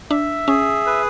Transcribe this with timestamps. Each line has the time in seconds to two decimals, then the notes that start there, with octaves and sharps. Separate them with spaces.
0.10 D4 E5
0.48 C#4 G#4
0.86 B4